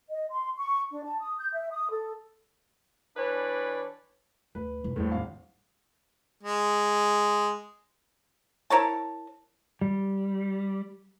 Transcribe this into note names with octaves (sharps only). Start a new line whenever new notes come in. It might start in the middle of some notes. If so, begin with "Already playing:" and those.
D#5
C6
C#6
D4
A5
D#6
G6
E5
D#6
A4
E3 D4 B4 C#5 D5
D2 B4
E1
A#1 E2 A2 G3
G#1 F5
G#3
E4 A#4 C#5 A5
G3